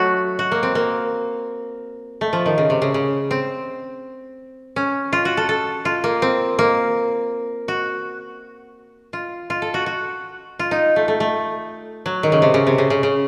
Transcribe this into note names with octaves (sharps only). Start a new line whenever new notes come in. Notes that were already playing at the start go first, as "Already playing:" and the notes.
Already playing: F#3 A3 F#4
F#4
A#3
C4
A#3
A3
F3
D#3
C#3
C3
C#3
C#3
C4
C#4
F4
F#4
A4
A4
F4
A#3
C4
A#3
F#4
F4
F4
A4
F#4
F#4
F4
D#4
A3
A3
A3
F#3
D#3
C#3
C3
C#3
C3
C#3
C#3
C#3